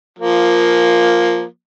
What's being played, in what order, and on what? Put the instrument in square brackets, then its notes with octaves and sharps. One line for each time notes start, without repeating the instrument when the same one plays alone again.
[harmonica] F3 A#3